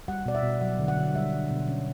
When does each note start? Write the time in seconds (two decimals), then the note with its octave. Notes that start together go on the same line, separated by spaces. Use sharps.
0.08 G3 F#5
0.26 B2 D5
0.35 E5
0.43 B2
0.61 F#3 F#5
0.79 D3
0.88 F#5
0.97 D3
1.14 G3 E5
1.33 D4
1.51 B2
1.69 C#4